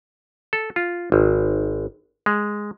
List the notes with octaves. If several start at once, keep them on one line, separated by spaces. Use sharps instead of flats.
A4
F4
G#1
G#3